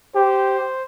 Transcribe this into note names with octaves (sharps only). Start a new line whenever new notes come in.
G4 C5